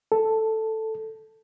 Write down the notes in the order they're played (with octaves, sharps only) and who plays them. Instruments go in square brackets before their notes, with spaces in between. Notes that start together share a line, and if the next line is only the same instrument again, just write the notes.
[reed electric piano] A4